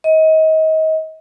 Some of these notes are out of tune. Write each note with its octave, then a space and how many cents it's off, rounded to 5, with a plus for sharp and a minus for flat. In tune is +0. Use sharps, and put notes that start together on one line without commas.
D#5 +30